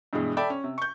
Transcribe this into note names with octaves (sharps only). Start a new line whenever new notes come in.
G2 B2 E3 G#3
A4 D5 E5 G5 B5 D6
C#4
C3
C#6 G6